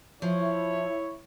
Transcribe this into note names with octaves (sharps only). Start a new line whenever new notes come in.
F3 E4 C#5